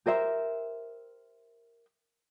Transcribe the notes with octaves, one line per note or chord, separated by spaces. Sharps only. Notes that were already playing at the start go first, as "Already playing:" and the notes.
G4 A#4 C5 E5